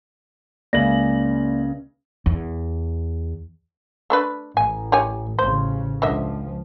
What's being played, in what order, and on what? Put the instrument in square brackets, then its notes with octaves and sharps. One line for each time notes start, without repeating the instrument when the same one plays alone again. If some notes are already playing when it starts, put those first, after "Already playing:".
[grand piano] C#2 C#3 F#7 [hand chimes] A#3 D5 A#6
[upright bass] E2
[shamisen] A3 D4 B4
[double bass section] A1 A2 [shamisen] G#5
[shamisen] G4 C#5 G#5
[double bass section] A1 C#3 [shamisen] C5
[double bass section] C#2 F3 [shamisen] D3 D#5 E5